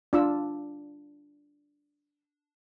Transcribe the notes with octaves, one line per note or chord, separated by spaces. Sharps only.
D4 F4 E6